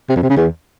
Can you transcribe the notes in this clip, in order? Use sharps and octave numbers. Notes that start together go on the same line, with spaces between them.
C3
F2
C3
C#3
E2